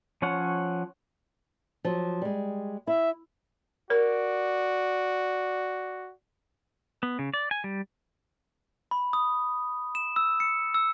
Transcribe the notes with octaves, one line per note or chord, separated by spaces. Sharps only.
F3 C#4 C#5 F#5
F3 F#3
G3 G#3
E4 E5
F#4 A#4 D5
B3
C#3
D5
G#5
G3
B5
D#6
E7
E6
C#7
E6